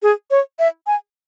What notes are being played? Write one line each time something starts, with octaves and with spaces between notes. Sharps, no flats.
G#4
C#5
E5
G#5